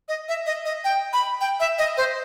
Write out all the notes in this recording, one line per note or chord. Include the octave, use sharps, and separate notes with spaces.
D#5
E5
D#5
D#5
G5
B5
G5
E5
D#5
C5